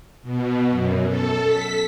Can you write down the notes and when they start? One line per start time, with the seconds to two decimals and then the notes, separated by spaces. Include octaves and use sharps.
0.23 B2
0.70 F#2
1.07 A4
1.47 B6